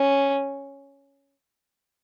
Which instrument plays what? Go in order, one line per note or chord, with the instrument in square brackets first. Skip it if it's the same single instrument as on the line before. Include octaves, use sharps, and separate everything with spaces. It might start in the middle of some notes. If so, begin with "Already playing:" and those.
Already playing: [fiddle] C#4